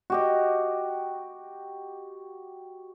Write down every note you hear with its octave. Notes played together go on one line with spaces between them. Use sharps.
F#4 G4 D#5